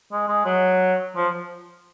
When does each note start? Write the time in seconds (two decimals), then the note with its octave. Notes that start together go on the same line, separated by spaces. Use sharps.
0.12 G#3
0.28 G#3
0.45 F#3
1.16 F3